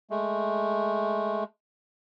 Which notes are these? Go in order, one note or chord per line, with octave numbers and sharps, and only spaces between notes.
G#3 A3